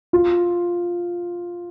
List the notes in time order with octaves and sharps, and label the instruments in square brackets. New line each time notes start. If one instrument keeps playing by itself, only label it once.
[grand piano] F4